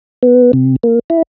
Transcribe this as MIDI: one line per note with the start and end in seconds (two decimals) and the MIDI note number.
0.23 0.52 59
0.53 0.76 48
0.83 0.99 58
1.10 1.22 64